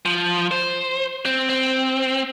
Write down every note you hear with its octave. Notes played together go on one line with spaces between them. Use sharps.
F3
C5
C4
C4